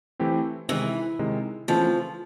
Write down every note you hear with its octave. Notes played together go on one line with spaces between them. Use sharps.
E3 A3 C4 E4 G4
C3 D#3 E3 G#3
C3 D#3 G#3
C#3 E3 F3 A3 C4